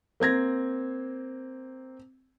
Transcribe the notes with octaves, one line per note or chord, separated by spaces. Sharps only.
A#3 C4 G#6 A#6